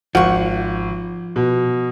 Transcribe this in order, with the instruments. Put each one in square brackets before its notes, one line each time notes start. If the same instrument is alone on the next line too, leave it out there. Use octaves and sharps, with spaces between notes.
[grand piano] G#1 [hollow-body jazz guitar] F3 [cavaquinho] F#5 C#6
[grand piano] B2